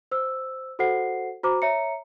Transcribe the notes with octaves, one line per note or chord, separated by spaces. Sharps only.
C5 E6
F#4 A4 C5 F#5 C7
F#4 C5 A#5 D6
C#5 E5 A#5 C#7